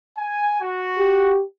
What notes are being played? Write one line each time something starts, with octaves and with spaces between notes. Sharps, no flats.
G#5
F#4
G4